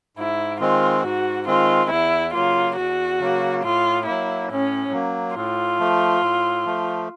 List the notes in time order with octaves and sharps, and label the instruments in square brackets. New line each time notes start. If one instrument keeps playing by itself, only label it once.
[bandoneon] G#2 [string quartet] E4
[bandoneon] D#3 G#3 C4 [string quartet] F4
[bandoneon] G#2 [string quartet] F#4
[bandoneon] D#3 G#3 C4 [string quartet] F4
[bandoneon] E2 [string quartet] E4
[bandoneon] C#3 F#3 A#3 [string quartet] F4
[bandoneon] E2 [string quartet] F#4
[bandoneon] C#3 F#3 A#3
[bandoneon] A2 [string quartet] F4
[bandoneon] F#3 A#3 [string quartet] E4
[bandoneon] A2 [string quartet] C#4
[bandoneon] F#3 A#3
[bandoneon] A2 [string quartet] F4
[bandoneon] F3 A3
A2
F3 A3